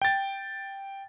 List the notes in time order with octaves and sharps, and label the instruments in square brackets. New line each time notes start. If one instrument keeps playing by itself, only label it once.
[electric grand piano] G5 A6